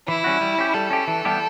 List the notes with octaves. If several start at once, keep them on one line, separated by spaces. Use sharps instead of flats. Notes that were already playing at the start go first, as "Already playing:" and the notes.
E3 E4
G3 C#4 F#4
G3
C#4 G4
G3 A4
C#4 G4
E3
G3 B3 E4 G4